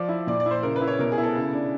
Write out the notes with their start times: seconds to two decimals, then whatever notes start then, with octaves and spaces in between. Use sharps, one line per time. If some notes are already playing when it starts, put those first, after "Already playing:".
Already playing: F3 D5
0.09 E4
0.27 A#2 D5
0.40 D5
0.46 E4 C5
0.63 C#3 A#4
0.76 B4
0.81 E4
0.88 C#5
0.99 B2 A#4
1.12 G#4
1.18 E4
1.23 A4
1.35 C#3
1.53 D4